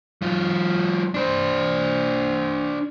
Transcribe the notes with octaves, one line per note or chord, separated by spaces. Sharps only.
F#3 F4
D4 C5